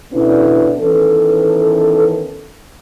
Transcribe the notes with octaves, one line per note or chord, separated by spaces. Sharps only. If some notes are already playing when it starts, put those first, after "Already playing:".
B2 D3 B3 C#4 D4 E4
D#3 E3 B3 C#4 A4